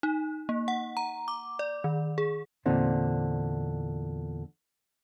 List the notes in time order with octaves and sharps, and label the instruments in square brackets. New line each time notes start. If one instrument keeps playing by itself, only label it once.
[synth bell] D#4
A#3
F#5
A#5
D6
D5
D#3
G#4
[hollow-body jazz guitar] E2 A#2 D3 C4 D#4